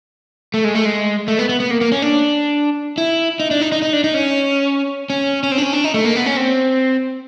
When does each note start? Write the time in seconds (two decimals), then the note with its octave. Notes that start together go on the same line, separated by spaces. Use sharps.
0.54 A3
0.64 G#3
0.75 A3
0.85 G#3
1.28 A3
1.39 B3
1.49 B3
1.60 B3
1.71 A#3
1.81 A#3
1.92 C#4
2.02 D4
2.98 E4
3.40 D#4
3.51 D4
3.61 D#4
3.72 D#4
3.82 D#4
3.93 D4
4.04 D#4
4.14 C#4
5.10 C#4
5.44 C#4
5.52 C4
5.58 D4
5.62 C#4
5.73 D4
5.84 D#4
5.94 A3
6.05 A#3
6.16 B3
6.26 C#4
6.37 C4